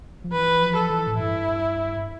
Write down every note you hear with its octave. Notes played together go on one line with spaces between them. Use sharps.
F3
E3 B4
F3
A4
E3
A2
G2 E4